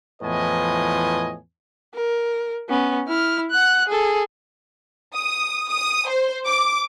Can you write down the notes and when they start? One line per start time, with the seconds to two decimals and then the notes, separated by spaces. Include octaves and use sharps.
0.23 E2 A2 F3 B4 D#5 G#5
1.95 A#4
2.69 B3 C#4
3.07 E4 F6
3.50 F#5 F#6
3.88 G#4 A4
5.14 D#6
5.69 D#6
6.08 C5
6.46 D6